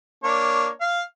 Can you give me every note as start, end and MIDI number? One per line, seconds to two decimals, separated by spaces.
0.24 0.68 58
0.24 0.68 62
0.24 0.68 73
0.81 1.01 77